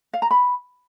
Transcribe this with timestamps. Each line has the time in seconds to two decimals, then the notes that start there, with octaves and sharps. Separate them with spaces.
0.13 F5
0.22 A#5
0.31 B5